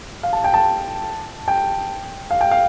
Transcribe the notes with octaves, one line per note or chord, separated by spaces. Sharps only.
F5
A5
G5
A5
G5
F5
G5
F5